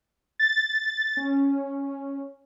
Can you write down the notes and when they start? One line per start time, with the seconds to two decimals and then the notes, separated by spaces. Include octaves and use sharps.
0.39 A6
1.17 C#4